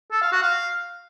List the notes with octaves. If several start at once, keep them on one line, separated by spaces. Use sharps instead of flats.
A4
F5
F#4
F5